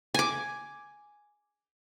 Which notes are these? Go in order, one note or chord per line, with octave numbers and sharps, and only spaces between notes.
G#5 D6